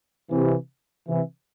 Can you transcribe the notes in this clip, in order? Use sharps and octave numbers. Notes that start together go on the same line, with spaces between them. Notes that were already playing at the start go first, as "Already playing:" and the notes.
C3 E3
C3 E3